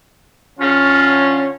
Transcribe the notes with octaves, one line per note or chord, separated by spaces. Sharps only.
D3 C#4 F4